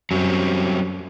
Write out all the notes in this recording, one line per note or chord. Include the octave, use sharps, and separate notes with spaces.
F#2 F#3 G3 C4